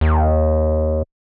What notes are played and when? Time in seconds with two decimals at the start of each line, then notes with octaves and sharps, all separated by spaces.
0.01 D#2